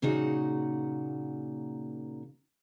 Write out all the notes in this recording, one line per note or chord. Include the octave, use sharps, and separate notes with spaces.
A#2 C#3 A#3 D#4 F#4 F#5